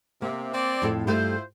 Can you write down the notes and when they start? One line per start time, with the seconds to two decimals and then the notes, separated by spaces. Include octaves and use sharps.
0.22 C3 A#3
0.54 C4 D5
0.82 F2 A2 A4
1.07 G2 A3 E4 F4 G4 C5